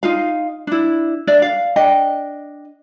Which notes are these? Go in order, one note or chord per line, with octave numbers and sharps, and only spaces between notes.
D#4 F4 F5
D4 E4
D4 D5 E5
F5
D4 D#5 G5